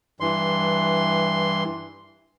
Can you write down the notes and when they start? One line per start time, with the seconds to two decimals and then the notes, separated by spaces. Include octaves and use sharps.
0.20 G2 E3 C6